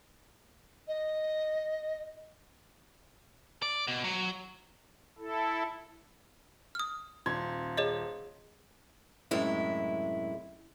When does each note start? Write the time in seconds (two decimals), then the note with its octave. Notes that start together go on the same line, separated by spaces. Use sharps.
0.87 D#5
3.62 D5
3.87 B2
4.04 F#3
5.19 E4 A4
6.75 D#6 F6
7.26 D#1 C6 G#6
7.77 G#4 C#5 D#5
9.31 F#2 A2 C3 G#3 E4